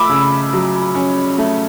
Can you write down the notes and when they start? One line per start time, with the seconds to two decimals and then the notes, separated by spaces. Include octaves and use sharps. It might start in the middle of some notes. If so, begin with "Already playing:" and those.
Already playing: A3 B5 D6 E6
0.09 C#3
0.53 F#3
0.95 C#4
1.38 A3